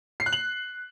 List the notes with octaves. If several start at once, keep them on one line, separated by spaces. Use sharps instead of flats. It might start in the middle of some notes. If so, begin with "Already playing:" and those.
C7
F#6
F#7